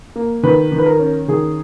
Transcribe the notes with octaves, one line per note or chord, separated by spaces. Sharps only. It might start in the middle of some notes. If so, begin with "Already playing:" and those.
A#3
D#3 B4
D#3
B4
A#4
C#4
D#3 G#4